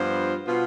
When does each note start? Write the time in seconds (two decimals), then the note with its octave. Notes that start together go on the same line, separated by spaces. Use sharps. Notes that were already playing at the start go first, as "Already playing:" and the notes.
Already playing: G2 F3 B3 F4 C5
0.47 B2 B3 F4